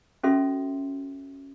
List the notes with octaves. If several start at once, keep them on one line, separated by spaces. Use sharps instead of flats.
C#4 F#4 A4 E5 C6